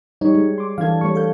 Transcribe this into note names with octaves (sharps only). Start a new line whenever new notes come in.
G3 D#4 C#5
G#3
C6 D6
E3 D4 A4 F5 G#6
G3 A3 C#5 C#6
A4 F5 G6